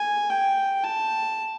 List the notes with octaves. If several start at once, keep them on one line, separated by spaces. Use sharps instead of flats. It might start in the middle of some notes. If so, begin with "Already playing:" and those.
Already playing: G#5
G5
A5